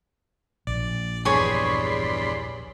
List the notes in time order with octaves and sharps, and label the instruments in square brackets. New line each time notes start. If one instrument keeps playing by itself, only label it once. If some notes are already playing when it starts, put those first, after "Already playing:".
[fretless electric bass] A#1 [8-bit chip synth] D5
[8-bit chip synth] E2 G2 [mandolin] G#4 C#5 [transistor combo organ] D5 B5 C6